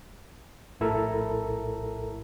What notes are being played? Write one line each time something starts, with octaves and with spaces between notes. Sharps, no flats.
A#1 A2 E4 A4 A#4 A#5